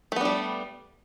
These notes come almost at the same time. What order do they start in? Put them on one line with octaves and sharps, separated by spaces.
A3 B3 D4 G3